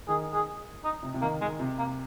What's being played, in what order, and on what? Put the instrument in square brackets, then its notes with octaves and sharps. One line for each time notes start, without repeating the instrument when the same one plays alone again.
[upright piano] D#3 [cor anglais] G#4
[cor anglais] G#4
D#4
[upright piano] C3
C3
[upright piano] D#3 [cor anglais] A#3
[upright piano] D#3 [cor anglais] G#3
[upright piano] C3
[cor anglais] A#3